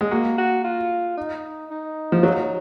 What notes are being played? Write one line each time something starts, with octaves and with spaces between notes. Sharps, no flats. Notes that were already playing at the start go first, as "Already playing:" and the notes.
G#3
A#3 F#4
F#4
F4
D#4
D#4
F3
F#3